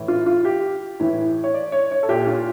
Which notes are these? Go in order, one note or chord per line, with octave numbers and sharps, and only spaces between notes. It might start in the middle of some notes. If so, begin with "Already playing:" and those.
Already playing: A2 E3
F4
F4
G4
A2 E3
C#5
D5
C#5
C#5
A4
A#2 G4
F4